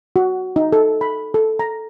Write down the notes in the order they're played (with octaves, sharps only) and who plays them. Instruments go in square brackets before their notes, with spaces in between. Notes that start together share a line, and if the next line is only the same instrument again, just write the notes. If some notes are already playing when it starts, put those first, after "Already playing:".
[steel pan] F#4
D#4
A4
B5
A4
A#5